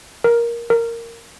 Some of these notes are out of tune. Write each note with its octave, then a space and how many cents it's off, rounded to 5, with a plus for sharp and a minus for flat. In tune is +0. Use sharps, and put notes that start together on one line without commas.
A#4 +10
A#4 -10